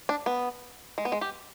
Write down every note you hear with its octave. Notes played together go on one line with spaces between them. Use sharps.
D4
B3
G#3
B3
G#3
G4